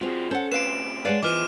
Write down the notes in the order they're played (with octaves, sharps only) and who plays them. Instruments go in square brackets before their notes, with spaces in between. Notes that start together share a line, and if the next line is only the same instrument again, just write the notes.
[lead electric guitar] F3 G#4 [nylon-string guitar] C4 F#4
[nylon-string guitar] C#4 [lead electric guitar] A4 [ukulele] C5 F#5
[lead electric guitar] D2 C3 [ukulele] B4 F5 [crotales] D7 E7
[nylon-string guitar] G#3 C#5 F#5 [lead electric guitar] D4 [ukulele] B4 D5 F5
[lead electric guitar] B2 F3 [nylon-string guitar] E3 [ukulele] B4 D#5 [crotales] D6 F6 D#7